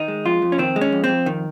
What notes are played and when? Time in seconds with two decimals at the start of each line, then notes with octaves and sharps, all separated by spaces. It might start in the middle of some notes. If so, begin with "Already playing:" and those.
Already playing: D#3 D#4
0.08 G#3
0.25 F2 F4
0.42 F2
0.52 C#4
0.58 D#3 C4
0.76 G#3
0.81 C#4
0.92 F2
1.04 C4
1.09 F2
1.26 D#3